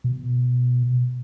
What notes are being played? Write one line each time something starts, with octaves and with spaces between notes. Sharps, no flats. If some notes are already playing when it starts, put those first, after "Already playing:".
B2